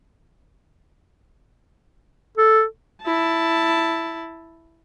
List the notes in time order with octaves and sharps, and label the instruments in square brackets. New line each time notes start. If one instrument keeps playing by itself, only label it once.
[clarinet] A4
[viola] E4 A5